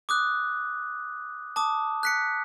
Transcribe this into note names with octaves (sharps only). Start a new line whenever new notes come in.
D6 D#6 F#6
A5 D6 D#6
F#6 B6 C#7